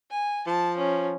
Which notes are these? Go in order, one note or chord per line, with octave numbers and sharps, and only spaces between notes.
G#5
F3 A5
C#4